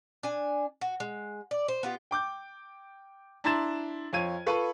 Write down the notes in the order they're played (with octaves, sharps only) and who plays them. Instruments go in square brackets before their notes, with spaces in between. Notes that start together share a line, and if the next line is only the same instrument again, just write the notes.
[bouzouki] D4 G#5
F#4
G#3
D5
C5
B3 F4 G4
[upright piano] G5 D6 G6
D4 E4 A#5 C6 A6 E7
F2 F4 C#5 G#6 D#7
F4 A4 B4 B5 C#6